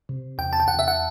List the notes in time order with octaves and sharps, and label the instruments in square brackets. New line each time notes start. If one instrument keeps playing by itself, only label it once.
[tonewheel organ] C3
[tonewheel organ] E2 [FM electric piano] G5
[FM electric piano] A5
G5
[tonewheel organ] E2 [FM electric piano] F#5
[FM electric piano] E5
F#5